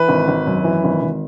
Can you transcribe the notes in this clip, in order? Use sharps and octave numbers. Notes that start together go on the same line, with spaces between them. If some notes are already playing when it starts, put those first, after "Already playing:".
Already playing: E3 B4
G#1
G#1
F#2
E3
G#1
G#1